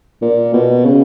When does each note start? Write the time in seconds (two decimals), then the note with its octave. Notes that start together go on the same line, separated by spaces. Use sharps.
0.22 A#2
0.54 B2
0.85 C#3